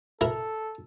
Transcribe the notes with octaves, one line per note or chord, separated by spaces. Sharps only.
E4 A4 A#4